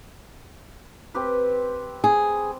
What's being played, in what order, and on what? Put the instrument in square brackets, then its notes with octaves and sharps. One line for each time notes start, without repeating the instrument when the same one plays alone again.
[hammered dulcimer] C4 G4 B4
[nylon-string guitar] G#4